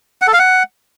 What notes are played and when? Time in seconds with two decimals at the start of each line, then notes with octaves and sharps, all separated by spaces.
0.22 F#5
0.27 A4
0.33 F5
0.39 F#5